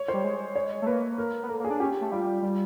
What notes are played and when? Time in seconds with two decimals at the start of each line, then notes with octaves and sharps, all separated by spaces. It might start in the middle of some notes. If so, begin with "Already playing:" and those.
Already playing: C#5
0.08 G3 C5
0.24 G#3
0.56 C#5
0.82 A3
0.86 A#3 B4
1.18 A#4
1.43 B3
1.49 A#3 A4
1.60 A#3
1.64 G#4
1.70 D4
1.80 C#4 G4
2.01 A3
2.12 G3 F4
2.42 G3 F4